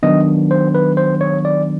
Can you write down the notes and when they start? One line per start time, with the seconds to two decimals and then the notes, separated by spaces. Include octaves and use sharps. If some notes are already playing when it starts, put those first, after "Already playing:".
0.03 D#3 F#3 B3 D4 D#5
0.51 C5
0.75 B4
0.97 C5
1.21 C#5
1.45 D5